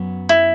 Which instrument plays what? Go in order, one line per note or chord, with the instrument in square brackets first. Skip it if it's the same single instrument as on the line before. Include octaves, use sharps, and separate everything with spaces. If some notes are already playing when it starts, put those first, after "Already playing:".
Already playing: [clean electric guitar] F#2 F#3 B3 F#4
[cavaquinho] E4